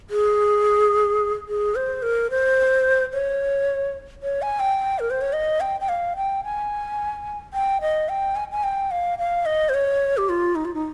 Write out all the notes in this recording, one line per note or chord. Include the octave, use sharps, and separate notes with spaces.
G#4
G#4
C5
A#4
C5
C#5
C#5
G#5
G5
A#4
C5
C#5
D#5
G5
G5
F5
G5
G#5
G5
D#5
G5
G#5
G#5
G5
F5
F5
D#5
C5
C#5
G4
F4
D#4
F4
D#4